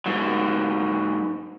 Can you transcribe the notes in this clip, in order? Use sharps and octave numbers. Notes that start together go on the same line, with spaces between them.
G#2 F#3